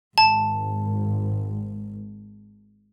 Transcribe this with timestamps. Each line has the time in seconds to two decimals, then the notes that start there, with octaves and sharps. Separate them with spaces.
0.18 G#1 A5